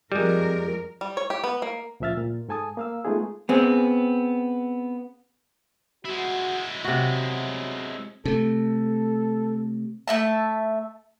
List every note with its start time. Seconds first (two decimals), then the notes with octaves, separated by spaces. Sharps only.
0.12 F2 G3 G#3 A#4
1.01 G3
1.17 C#5
1.30 G4
1.44 B3
1.62 A#3
2.00 C#2 A#2 F3 E5 F6 A6
2.17 A#2
2.49 G#2 A4 G#5 A5 D#6
2.77 A#3 F5 E6
3.05 G#3 A3 B3 D#4 F4 G#4
3.49 B3 C4 G#4
6.05 G#3 E4 F#4
6.84 C3 F#3 F#4
8.25 C3 A3 A4
10.08 A3 E5 A5